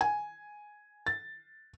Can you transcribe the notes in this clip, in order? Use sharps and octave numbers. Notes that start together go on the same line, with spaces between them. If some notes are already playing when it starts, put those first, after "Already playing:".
G#5
A6